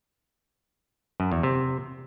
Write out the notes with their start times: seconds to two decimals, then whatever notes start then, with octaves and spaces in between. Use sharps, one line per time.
1.20 F#2
1.32 E2
1.43 C3